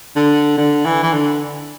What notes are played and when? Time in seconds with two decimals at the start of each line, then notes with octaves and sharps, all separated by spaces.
0.16 D3
0.57 D3
0.85 E3
1.03 E3
1.13 D3